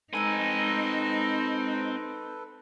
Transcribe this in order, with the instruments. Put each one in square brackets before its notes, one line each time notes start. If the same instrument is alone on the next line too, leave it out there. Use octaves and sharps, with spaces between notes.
[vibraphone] G#3 A#5 E6 [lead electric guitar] C4 G#5 [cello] D#4 [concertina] A4 B4